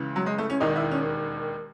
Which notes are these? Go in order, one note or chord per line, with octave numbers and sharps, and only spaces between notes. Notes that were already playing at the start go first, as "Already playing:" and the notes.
Already playing: C#2 C#3 E3
F#3
G#3
A3
C#4
E1 D#2 D#3 D#4
E4
C#4